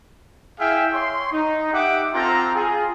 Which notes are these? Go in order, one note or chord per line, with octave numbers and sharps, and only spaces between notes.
E4 G#4 E5 F5 G5
C#5 C6
D#4
G4 E5 F#5 D6
C4 F4 A4 A#5
F4 G#4